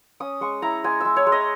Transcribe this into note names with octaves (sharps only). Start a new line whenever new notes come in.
C#4 D#6
G#3 C#6
E4 A#5
G#3 G#5
G#3 E5
C#5
G#3
D#5